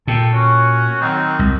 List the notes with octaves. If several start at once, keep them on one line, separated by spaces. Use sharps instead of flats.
A#2 A4 G5 A5
C#4 F#4
D#3 F#3 C4
C2